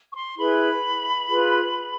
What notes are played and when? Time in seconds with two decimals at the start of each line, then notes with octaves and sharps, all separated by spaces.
0.12 C#6
0.15 C6
0.38 E4 G#4 B4 B5
1.28 F4 G#4 B4